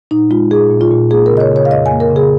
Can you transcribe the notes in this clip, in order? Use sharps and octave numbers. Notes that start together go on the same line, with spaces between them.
A#2 D#4
G#3 F4
A#2 G#4
A#2
F4
A#2
A#3 G#4
C#3 A#4
D#5
C#5
C#3 C#5
F5
F2 D#5
G#5
A#3
A#4
C#3
G#4